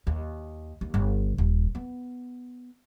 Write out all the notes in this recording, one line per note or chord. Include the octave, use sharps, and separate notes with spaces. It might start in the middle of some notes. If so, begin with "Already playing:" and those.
D#2
D#2
G1
D#1
B3